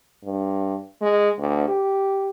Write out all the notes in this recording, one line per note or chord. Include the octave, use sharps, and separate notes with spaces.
G2
G#3
D2
G4